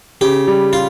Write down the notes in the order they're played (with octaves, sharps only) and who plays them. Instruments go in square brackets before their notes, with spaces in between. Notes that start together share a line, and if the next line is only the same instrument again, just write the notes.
[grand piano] C#3 [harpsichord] G4
[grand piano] G3
[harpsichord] F4